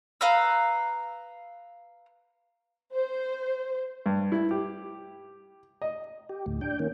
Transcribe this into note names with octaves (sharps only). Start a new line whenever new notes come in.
B4 F5 A#5 E6
C5
G2
E4
G4
D#5
G4
D2 A2
D4 G5
D#3 A#3 C#4